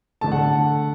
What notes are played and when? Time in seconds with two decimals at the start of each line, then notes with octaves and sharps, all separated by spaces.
0.21 D3 A3 A5
0.32 F#5